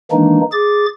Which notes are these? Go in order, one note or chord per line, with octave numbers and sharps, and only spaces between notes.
D#3 E3 G#3 A#3 D4 D#4
G#4 D6 A6